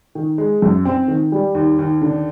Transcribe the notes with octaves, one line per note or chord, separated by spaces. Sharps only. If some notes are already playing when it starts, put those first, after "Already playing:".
D#3
G#3
F#2
C4
D#3
G3
D#2
D#2
D3